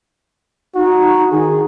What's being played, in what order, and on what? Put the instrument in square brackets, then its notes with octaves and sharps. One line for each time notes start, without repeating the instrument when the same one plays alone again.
[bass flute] D#4 [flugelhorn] F#4
[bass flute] D#3 [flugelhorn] G#4